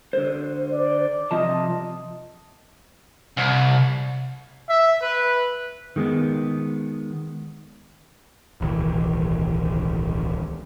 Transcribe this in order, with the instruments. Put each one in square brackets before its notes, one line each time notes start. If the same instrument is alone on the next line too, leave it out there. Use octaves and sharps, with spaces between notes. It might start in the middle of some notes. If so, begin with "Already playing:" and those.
[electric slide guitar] D3 C5
[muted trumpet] D5
[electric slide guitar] C3 F3 A5 [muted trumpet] D#5
[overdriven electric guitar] C2
[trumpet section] E5
B4
[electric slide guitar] D#3 G#3 A#3 B3
[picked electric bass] D1 B1 D#3 E3